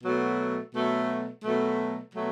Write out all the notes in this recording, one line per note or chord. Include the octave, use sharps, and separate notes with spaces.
B2 F#3 A3
B2 F#3 A3
B2 F#3 A3
B2 F#3 A3